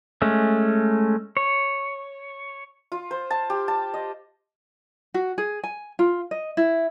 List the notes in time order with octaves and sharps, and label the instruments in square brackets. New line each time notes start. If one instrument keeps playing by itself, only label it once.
[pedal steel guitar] G#3 A3 C#4
C#5
[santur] F4
C5
A5
G4
A5
D#5
[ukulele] F#4
G#4
G#5
F4
D#5
E4